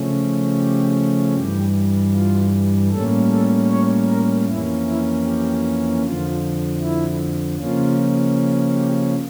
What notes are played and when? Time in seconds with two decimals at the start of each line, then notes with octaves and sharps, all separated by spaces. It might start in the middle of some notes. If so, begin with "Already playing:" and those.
Already playing: C#3 F3 A3 C#4
0.57 G4
1.35 G2 E3 G3 G4
2.13 F4
2.91 A2 G3 A#3 C#4 A4
3.30 A4
3.69 C#5
4.08 A#4
4.46 F2 E3 A#3 C#4 E4
4.85 E4
5.24 G4
6.02 F2 D3 F3 F4
6.81 E4
7.58 C#3 F3 A#3 C#4 F4
8.75 G4